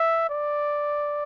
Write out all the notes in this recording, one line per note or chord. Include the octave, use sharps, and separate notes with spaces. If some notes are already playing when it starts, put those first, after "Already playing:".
Already playing: E5
D5